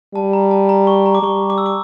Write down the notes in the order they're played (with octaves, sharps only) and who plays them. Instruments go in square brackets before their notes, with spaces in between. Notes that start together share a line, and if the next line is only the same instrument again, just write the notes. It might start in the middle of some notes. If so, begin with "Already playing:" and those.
[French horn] G3 [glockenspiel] A5
[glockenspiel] A#5
A5
A#5
C#6
A#5
D6
[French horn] G3 [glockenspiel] C#6
[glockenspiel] D6
E6
D6